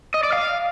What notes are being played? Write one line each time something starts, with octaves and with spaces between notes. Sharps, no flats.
D#5
D5
F5